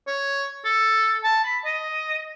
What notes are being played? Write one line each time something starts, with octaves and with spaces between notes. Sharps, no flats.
C#5
A4
A5
B5
D#5